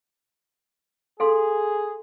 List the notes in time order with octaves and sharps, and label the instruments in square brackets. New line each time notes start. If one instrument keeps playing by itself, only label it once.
[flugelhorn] G#4 [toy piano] A4 F5 C6